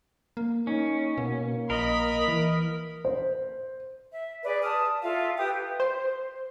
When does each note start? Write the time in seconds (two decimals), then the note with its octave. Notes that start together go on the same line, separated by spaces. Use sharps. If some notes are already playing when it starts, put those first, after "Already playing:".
0.37 A#3
0.67 C#4 D#4
1.18 B2 A#3
1.70 A#1 A#4 D#5 B5
2.28 E3
3.05 C5
4.12 E5
4.44 G#4 B4 D5
4.63 A5 D#6 F6
5.02 F4 A4 E5 F5
5.37 G4 B4 G5 D#6
5.80 C5